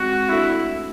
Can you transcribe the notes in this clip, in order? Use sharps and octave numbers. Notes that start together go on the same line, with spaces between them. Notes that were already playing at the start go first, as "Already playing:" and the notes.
Already playing: G#3 C4 F#4
A3 D4 E4 F#4